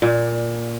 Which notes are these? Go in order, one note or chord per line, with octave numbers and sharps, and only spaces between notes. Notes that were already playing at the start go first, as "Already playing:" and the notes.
A#2